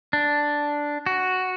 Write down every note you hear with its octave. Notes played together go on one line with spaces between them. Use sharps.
D4
F#4